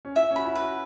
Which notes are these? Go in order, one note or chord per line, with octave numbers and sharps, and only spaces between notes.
C#4
E4 E5
C#4
F#4 B5
E4
F#4 B4